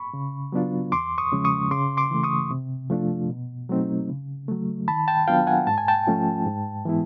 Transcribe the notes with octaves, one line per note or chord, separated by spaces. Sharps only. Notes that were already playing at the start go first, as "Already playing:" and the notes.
Already playing: B5 C#6
C#3
F#3 B3 D4 F4
E2 C6 D6
C#6 D#6
C#3 F3 G#3 C#4
C#6 D#6
C#3 C6 D6
C6 D6
E3 A3
C#6 D#6
C3
F3 A3 D4 F4
B2
F#3 A3 C4 D#4
C#3
F#3 A3
D#3 A5 B5
G5 A5
F#3 B3 D4 F4 F5 G5
F#5 G#5
G#2 A5
G#5
G5 A5
F3 A3 C#4 F4
G#2
E3 G#3 B3 E4